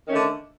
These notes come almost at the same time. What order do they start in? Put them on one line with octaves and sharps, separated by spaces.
D#3 C#4 A3 D3